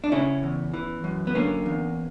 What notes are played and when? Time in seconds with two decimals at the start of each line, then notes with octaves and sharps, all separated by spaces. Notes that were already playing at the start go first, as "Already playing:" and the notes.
0.04 D4
0.12 C#3 C#4 E4
0.43 E2
0.74 E3
1.04 F#2
1.27 B3
1.35 D3 A#3 C#4
1.66 E2